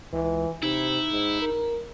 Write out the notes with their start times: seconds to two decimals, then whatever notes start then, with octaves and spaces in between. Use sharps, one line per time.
0.13 C#2 E3
0.63 C3 D#4 E4
1.11 G#2
1.41 A#4